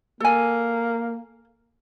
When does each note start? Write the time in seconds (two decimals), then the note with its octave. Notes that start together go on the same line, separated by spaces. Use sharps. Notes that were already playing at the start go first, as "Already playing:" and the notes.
0.20 A#3 A4 G#5